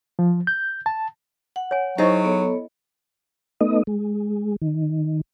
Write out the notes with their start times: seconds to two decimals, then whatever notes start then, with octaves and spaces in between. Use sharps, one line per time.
0.19 F3
0.47 G6
0.86 A5
1.56 F#5
1.71 C#5 G#5
1.98 F#3 D#4 E4 G#4 C5 D#5 E5 C#6
2.25 B3 A4 C#5
3.61 A3 B3 D#4 D#5
3.87 G#3
4.62 D#3